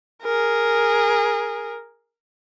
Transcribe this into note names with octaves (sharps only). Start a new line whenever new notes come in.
G#4 A#4